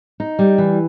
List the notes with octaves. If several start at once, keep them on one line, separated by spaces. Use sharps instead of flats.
D#4
G3
E3